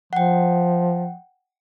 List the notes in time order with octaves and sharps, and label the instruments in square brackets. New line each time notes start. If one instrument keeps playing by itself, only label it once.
[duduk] F3 [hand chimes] F#5 G5